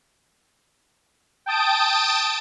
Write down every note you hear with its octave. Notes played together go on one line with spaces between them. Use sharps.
G5 A5 D#6 D7